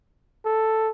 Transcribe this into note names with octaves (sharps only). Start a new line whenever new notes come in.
A4